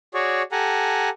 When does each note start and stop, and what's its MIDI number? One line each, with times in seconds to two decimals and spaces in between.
0.14 0.42 66
0.14 0.42 68
0.14 0.42 73
0.14 0.42 74
0.52 1.09 67
0.52 1.09 69
0.52 1.09 78
0.52 1.09 80
0.52 1.09 82